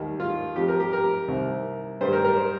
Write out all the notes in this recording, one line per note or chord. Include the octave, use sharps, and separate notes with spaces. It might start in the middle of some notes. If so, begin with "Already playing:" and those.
Already playing: D#2 D#3 G3
F4
F2 F3 G4
A#4
G4
A#4
C2 C3 D#3
G2 D#3 G3 C5
A#4
A#4
C5